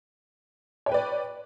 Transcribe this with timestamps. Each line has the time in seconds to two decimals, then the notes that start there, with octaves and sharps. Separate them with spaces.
0.86 C#5
0.89 G5
0.92 B4
0.94 D5